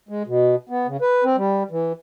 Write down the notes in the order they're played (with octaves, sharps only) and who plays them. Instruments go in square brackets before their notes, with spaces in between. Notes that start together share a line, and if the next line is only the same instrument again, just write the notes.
[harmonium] G#3
B2
B3
C#3
B4
C4
G3
E3